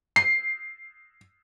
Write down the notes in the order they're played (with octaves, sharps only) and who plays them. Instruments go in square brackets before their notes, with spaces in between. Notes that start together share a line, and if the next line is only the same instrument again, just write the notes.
[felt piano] C7